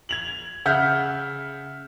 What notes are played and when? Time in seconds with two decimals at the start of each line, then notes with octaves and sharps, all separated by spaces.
0.09 G#6 F7 F#7
0.65 C#3 E5 F#5 F6 G6